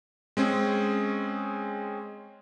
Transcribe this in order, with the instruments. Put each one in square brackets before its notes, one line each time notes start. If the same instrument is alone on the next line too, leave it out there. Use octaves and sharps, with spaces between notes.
[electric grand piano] G#3 C4 C#4 G#4